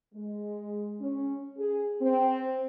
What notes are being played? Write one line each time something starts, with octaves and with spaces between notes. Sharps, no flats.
G#3
C#4
G#4
C4